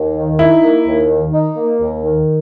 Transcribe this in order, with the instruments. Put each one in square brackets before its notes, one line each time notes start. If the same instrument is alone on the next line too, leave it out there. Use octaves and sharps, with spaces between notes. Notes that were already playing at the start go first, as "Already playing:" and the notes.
Already playing: [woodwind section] D#2
D#3
[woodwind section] D#4 [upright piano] E4
[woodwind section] A#3
D#2
D#3
D#4
A#3
D#2
D#3